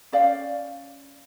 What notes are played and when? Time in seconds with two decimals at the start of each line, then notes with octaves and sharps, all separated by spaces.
0.12 C#4 D5 F5 G5